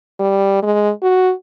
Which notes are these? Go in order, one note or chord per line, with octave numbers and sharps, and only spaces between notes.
G3
G#3
F#4